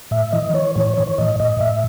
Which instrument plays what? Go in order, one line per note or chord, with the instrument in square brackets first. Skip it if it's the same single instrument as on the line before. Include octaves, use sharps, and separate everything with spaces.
[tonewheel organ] A2 E5
E3 D#5
E3 C#5
A2 C#5
E3 C#5
C#5
A2 D#5
A2 D#5
A2 E5